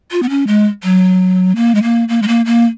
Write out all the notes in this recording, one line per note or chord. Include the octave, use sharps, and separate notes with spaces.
F4
B3
C#4
G#3
F#3
A#3
G#3
A#3
A#3
G#3
A#3
A#3